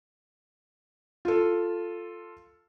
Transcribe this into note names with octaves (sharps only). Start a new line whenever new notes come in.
F4 A4